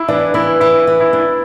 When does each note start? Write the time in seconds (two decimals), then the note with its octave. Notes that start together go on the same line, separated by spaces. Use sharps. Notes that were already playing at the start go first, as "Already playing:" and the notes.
Already playing: E4
0.08 E3 D4
0.34 E3 E4
0.60 E3 E4
0.87 E3
1.00 E4
1.13 D4